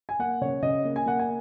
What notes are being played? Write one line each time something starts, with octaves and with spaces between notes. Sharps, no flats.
G#5
A#3 F#5
C#3 C#5
C#3 D#5
A#3
G#5
A#3 F#5
G#5